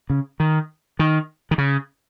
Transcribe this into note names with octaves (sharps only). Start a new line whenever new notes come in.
C#3
D#3
D#3
D#3
C#3